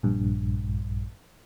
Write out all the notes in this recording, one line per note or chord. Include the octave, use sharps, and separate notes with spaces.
A#1 G2